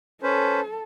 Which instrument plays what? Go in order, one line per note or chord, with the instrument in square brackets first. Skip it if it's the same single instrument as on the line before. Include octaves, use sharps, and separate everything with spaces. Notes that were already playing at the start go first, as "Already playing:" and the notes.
[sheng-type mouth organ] C#4 B4 C5 [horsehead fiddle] A4